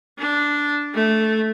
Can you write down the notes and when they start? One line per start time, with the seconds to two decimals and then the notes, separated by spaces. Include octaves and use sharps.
0.19 D4
0.95 A3